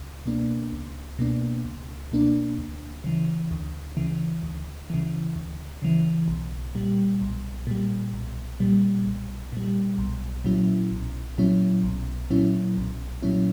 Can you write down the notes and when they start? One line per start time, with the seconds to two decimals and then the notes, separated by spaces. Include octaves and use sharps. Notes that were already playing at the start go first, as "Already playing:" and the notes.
Already playing: C#2
0.26 B2 A#3 D4
0.73 C#2
1.19 B2 A#3 D4
1.65 C#2
2.12 B2 A#3 D4
2.58 D2
3.04 C#3 E3
3.51 D2
3.97 C#3 E3
4.43 D2
4.90 C#3 E3
5.35 D2
5.82 C#3 E3
6.28 B1
6.75 A#2 G3
7.22 B1
7.67 A#2 G3
8.14 B1
8.60 A#2 G3
9.06 B1
9.52 A#2 G3
9.98 B1
10.45 A#2 F#3 C#4 E4
10.91 B1
11.38 A#2 F#3 C#4 E4
11.83 B1
12.30 A#2 F#3 C#4 E4
12.77 B1
13.22 A#2 F#3 C#4 E4